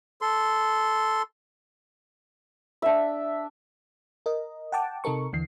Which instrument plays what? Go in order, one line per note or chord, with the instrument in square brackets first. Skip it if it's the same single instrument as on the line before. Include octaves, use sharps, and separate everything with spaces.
[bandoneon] A4 C6
[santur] D4 E5
[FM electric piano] A#4 D#5
F#5 G5 A5 D6
C3 D#4 A4 A#4 C#6
D#2 D3 E3 C7